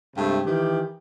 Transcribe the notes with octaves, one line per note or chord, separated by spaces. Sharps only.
G2 C3 G#3 A3
D#3 E3 G4